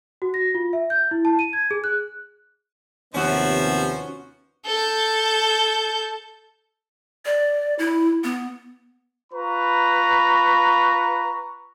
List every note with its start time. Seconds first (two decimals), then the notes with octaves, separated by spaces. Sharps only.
0.22 F#4
0.34 A#6
0.54 F4
0.73 E5
0.90 G6
1.11 E4
1.25 A5
1.39 D#7
1.53 G#6
1.71 G#4
1.84 F#6
3.14 D#2 C3 F3 B3 C#4 F#4 C5 E5
4.66 A4 G6
7.25 D5
7.79 E4
8.24 B3
9.33 F4 B4 A#5 B5 C#6